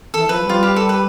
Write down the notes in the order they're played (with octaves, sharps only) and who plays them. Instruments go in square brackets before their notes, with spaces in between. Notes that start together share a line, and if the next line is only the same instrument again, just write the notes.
[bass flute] E3 [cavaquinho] A4
[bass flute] F3 [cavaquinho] B4
[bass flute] G3
[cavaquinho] F4
G4
A4
B4